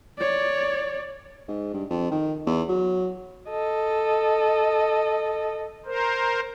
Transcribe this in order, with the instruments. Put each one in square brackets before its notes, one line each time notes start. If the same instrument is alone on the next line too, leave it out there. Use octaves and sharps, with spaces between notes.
[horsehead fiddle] C#5 D5
[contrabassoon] G#2
G2
F2
D#3
E2
F#3
[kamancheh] A4 D#5
[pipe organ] A#4 C5